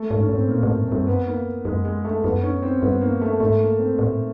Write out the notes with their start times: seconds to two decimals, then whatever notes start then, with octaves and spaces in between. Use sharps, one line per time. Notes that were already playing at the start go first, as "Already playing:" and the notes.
Already playing: A3
0.11 G#2
0.20 C#4
0.29 G#2
0.35 C4
0.48 A#2 A#3
0.63 A2
0.78 G2
0.88 G2 C4
1.07 F#2 B3
1.27 A#3
1.65 F#2 G#3
1.85 G#3
2.05 A3
2.23 F#2 B3
2.43 C#4
2.62 C4
2.82 G2 B3
3.01 A#3
3.21 A3
3.40 G#2 A3
3.60 A#3
3.79 C4
3.99 A2